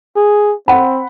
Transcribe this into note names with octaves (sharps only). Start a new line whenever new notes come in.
G#4
C4 F#5 B5